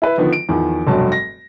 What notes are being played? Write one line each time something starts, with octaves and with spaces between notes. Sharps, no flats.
E4 B4
D3 D#3 F3 B3
D7
E2 D#3 F3
F1 G2 B2 F#3 A5
A#6